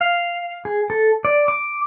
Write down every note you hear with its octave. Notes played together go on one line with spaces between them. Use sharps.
F5
G#4
A4
D5
D6